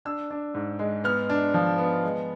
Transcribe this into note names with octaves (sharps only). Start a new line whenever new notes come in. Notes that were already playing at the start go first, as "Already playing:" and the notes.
D4 E6
D4
G#2
G#3
B3 F6
D4
F3
B3
G#3